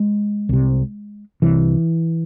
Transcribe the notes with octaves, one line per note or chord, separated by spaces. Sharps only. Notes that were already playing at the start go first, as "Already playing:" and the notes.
Already playing: G#3
C2 C3
C2 C3 E3